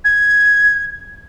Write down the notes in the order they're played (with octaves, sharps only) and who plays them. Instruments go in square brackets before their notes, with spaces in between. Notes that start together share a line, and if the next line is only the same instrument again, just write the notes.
[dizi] G#6